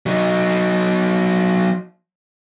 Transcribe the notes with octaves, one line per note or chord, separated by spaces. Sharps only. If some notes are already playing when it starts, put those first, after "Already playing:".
F#3 D#4